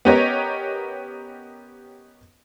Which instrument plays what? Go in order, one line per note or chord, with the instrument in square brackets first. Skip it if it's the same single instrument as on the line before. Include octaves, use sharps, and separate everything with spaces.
[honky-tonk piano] B3 C#4 G4 A#4 C#5 D#5